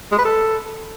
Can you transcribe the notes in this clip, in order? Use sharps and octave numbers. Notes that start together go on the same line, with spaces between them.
G#3
B4
A4